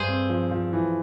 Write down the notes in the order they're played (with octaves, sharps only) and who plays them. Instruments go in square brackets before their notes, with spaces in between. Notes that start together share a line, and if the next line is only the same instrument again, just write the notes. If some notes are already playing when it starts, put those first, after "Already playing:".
Already playing: [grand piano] G2 [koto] G#4 C5
[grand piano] C4
F3
F3
E3